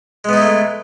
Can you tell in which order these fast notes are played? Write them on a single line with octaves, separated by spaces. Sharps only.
G#3 B3 D#4 E4 A3